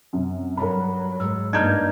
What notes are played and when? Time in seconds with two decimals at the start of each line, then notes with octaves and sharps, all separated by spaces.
0.13 F#2 C3
0.57 G2 F#3 G3 C#4 A#4 B5
1.20 G#2 G#3 E6
1.53 G2 A#3 D4 D#4 F6 G6 G#6